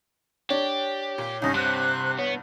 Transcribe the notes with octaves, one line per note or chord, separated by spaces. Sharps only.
D4 G4 C#5
A#2
C2 G2 C#4 D#4
C3 C5 F#6
B3 C#5